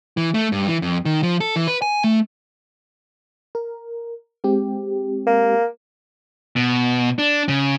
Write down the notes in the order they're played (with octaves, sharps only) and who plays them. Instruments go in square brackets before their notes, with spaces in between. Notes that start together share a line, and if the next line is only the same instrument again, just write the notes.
[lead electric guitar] E3
A3
G2
E3
F2
D#3
F3
A4
E3
B4
G#5
A3
[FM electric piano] A#4
G#3 C4 G4
[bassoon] A#3
[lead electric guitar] B2
D4
C#3